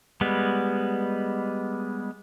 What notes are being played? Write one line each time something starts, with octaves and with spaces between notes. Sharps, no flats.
G3 G#3 B3